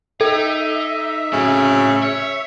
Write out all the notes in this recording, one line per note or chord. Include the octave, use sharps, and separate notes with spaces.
D#4 A4 E5
A2 C#3 F#3
C#5